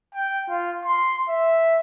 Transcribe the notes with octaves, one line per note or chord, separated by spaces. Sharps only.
G5
F4
C6
E5